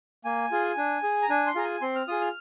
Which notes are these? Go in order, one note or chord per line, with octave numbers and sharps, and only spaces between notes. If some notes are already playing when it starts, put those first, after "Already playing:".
A#3 G#5
F4 G#4
D4
G#4
A#5
D4 G#5
C6
F4 G#4 A#5
G#5
C4 C6
F6
F4 G#4 D#6
F6